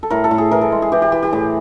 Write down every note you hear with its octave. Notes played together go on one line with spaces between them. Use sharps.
A4
A2 A#4
A4
A2
G#4
E3 A#4
A4
G#3
G#4
E3 G4
G4
E3 G4
G4
A2 G#4